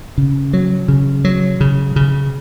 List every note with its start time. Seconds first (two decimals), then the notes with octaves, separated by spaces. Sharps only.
0.18 C#3
0.53 F#3
0.88 C#3
1.25 F#3
1.61 C#3
1.96 C#3